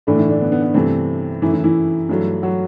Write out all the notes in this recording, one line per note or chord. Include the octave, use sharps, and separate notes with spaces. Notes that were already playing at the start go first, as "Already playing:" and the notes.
A2 D3 E3 A3 D4
E3 E4
D3 D4
B3
B3
B3
G2 C3 E3 A3 C4
F#2 E3 A3 E4
E3 E4
E3 E4
G2 F#3 A3
F#3 F#4